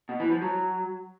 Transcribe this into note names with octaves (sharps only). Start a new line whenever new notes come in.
B2
E3
F3
F#3